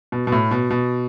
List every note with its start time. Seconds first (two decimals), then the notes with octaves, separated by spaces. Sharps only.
0.12 B2
0.27 B2
0.32 A2
0.51 B2
0.71 B2